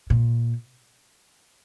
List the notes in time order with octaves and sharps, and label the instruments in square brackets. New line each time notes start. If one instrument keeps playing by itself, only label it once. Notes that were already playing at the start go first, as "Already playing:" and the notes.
[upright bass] A#2